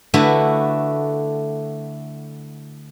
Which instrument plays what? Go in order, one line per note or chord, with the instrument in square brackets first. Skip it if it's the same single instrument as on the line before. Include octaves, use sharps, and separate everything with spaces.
[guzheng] D3 A3 E4 F#4 A4 B4